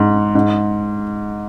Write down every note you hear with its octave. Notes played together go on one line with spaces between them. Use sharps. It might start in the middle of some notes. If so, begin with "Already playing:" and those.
Already playing: G#2
G#2